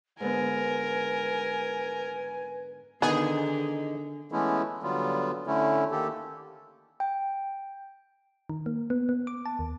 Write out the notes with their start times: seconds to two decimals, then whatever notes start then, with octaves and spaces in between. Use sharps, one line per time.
0.20 G#2 D3 B3 A#4 B4 G#5
3.02 D3 D#3 B3 D#4 G#4
4.32 E3 G#3 A3 B3 C#4 E4
4.83 D3 F#3 G3 B3 F4
5.47 D3 A3 C#4 E4
5.91 D#3 A#3 G4 A4
7.00 G5
8.49 D#3
8.66 A#3
8.90 B3
9.09 B3
9.27 D6
9.46 A5
9.59 D#2